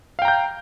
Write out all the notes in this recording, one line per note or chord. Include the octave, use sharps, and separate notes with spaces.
F5 G5 A#5 G6